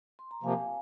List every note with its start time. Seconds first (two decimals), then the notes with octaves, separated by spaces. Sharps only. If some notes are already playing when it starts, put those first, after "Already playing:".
0.19 C6
0.31 A#5
0.43 C3 F3 A#3 F5 G#5